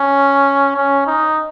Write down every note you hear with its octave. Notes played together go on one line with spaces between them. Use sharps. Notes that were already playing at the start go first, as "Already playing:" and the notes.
Already playing: C#4
C#4
D#4